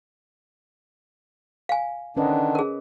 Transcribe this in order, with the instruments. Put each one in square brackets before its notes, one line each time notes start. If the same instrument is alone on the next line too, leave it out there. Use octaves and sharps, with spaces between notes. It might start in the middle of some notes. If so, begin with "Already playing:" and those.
[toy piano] F5 G#5
[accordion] D3 D#3 D4 [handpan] C#4 B4 D#5
[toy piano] G#4 A#4